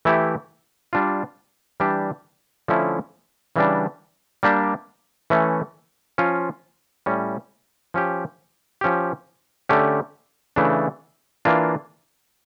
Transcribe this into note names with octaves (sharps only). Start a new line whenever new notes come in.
E3 A3 E4 G4
G3 D4 F4
E3 G3 D4 G4
D3 F3 A3 C#4 E4
C#3 E3 G3 D4
G3 A#3 D4 G4
E3 A3 C#4
F3 C#4 F4
A2 G3 C#4
F3 C#4 G4
F3 C#4 G4
D3 A3 C#4 G4
C#3 E3 A3 D4
E3 A#3 D4 F4